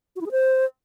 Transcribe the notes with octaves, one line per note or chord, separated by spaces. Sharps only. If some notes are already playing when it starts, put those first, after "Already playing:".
F#4
E4
G#4
C5